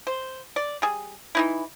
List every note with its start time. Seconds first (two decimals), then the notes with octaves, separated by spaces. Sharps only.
0.07 C5
0.56 D5
0.82 G3 G#4
1.35 E3 D#4 E4